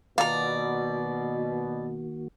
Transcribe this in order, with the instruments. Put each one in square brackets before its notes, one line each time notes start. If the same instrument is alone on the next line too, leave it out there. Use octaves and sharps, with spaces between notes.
[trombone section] B2 [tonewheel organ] D#3 A#3 F#4 [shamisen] F4 F5 [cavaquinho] D5 A#5